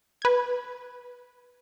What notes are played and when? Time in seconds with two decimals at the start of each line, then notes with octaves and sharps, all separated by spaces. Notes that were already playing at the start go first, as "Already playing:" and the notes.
0.22 B4 G#6